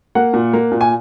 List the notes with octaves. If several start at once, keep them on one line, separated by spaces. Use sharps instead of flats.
A#3 F#5
A#2
A#3
A#2
G#5